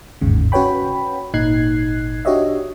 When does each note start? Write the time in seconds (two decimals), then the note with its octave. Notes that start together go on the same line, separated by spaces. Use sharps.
0.21 G1 D#2 G#2 C#3
0.52 C#4 F#4 B4 C#5 G5 B5
1.34 G#1 A#2 D#4 F#6 G#6 C7
2.25 D4 F#4 G4 C#5 D#5 E5